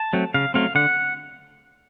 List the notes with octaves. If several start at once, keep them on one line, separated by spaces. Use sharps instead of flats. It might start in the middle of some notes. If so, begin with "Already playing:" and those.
Already playing: A5
F#3 A3 C4
C#3 F5
F#3 A3 C4 F5
D3 F#5